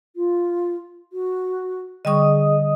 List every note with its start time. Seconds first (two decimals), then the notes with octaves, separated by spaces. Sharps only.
0.16 F4
1.13 F#4
2.05 D3 G3 G#4 D#5 C#6 D#6